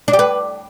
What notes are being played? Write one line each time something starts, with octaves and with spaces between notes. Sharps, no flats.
D4
G4
B4